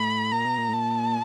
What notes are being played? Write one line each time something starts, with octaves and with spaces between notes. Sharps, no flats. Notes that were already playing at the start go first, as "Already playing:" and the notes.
Already playing: A2 B5
A#2 A#5
B2
A#2
A2
A#2 A5